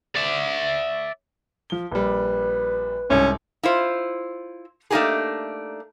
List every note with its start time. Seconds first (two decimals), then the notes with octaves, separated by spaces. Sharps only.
0.16 D5 E5
1.70 F3 G7
1.92 A#1 G3 B4
3.10 C2 G#2 C#4 E6
3.63 E4 F4 C5
4.90 A3 A#3 D4 D#4 G4 G#4